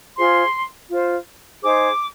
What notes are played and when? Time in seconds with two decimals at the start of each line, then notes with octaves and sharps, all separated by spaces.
0.16 F4 G#4 C5 C6
0.89 F4 C5
1.62 D#4 G#4 C5 D6